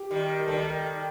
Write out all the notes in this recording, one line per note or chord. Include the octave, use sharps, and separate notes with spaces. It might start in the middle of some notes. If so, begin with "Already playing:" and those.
Already playing: G4
D#3 G3
A#4
D#3 G3 A4